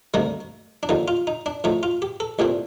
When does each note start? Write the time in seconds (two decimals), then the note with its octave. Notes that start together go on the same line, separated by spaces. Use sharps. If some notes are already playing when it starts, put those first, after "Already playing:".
0.14 D2 C3 D#3 G3 A#3
0.83 D4
0.89 D#2 D3 F3 D#4
1.08 F4
1.27 D#4
1.46 D4
1.64 A2 F3 A3 D#4
1.83 F4
2.02 G4
2.20 A4
2.39 C2 A#2 A3 C4 G4